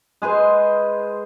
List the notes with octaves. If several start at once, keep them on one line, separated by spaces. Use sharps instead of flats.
G#3 G#4 B4 C5